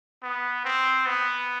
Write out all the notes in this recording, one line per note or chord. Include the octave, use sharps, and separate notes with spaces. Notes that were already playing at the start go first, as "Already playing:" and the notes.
B3
C4
B3